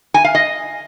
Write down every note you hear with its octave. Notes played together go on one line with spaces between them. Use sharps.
G#5
F5
D#5